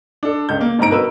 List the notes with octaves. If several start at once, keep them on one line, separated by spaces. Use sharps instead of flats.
D4 A4
C#2 G6
A#3
G1 G#2 C4 A#5 D7
B2 A#4 B4 E6